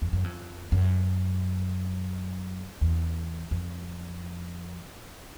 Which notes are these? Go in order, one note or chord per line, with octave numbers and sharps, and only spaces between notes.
F2
F#2
F2
F#2
E2
F2